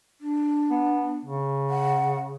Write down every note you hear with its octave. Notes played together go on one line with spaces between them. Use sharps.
D4
B3
C#3
F#5